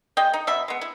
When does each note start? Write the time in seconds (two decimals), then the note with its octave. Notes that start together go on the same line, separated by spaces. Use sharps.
0.17 G#3 D#5 G5
0.34 D#4
0.47 B2 E5 B5
0.68 G#3 B3
0.81 E4